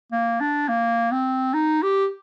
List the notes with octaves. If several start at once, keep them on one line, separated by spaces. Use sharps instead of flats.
A#3
D4
A#3
C4
D#4
G4